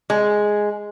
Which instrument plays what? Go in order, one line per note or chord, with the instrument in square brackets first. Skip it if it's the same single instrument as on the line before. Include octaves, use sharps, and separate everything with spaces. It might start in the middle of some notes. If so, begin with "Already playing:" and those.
[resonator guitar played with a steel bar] G#3